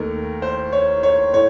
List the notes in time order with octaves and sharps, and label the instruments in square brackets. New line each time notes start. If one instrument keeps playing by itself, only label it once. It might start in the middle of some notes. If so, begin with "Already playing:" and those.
Already playing: [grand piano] D#2 D#3 A3 A#4
C5
C#5
C#5
A2 C#5